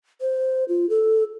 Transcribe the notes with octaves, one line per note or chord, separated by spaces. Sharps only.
C5
F4
A4